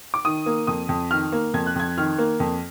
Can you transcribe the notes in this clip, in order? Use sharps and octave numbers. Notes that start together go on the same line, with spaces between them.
D6
D#3 D#6
A#3
F2 D#6
F2
D#3 F6
A#3
F2 G#6
F#6
F2 G#6
D#3 F6
A#3
F2